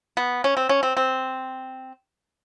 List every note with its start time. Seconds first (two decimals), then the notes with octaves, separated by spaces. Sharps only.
0.17 B3
0.44 C#4
0.57 C4
0.69 C#4
0.83 C4
0.97 C4